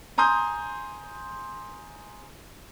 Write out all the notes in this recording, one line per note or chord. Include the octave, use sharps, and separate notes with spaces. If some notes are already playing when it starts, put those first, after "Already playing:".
G#5 A#5 C6 D#6 G6